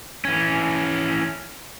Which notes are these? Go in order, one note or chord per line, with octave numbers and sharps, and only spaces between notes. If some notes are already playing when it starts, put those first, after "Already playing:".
E3 C#4